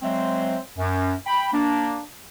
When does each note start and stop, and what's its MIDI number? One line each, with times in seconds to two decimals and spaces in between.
0.02 0.56 54
0.02 0.56 56
0.02 0.56 60
0.02 0.56 72
0.02 0.56 76
0.77 1.12 42
1.26 1.47 79
1.26 1.47 83
1.52 1.99 58
1.52 1.99 62